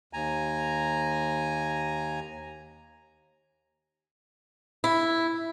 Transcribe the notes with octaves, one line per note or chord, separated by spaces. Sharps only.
D#2 G#5 A#5
E4